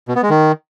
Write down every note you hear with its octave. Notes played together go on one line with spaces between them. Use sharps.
B2
B3
G#3
D#3